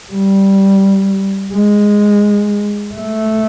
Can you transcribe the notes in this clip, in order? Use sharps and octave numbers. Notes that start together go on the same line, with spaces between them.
G3
G#3
A3